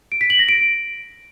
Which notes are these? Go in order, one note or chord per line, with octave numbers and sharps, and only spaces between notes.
D7
B6
F#7
A#6
D7